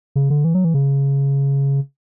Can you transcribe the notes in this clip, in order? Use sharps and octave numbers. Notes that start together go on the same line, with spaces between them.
C#3
D3
E3
F#3
E3
C#3